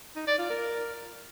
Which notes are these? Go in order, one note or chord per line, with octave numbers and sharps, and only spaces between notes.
D#4
D5
F4
A#4